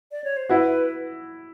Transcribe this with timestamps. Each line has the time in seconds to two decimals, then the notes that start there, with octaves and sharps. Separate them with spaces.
0.12 D5
0.24 C#5
0.37 C5
0.49 E4 F#4 B4